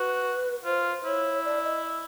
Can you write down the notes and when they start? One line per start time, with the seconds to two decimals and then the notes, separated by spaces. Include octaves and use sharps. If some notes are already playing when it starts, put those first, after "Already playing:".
Already playing: F#4 B4
0.65 F4 C5
1.04 E4 C#5
1.45 D5
1.64 D#5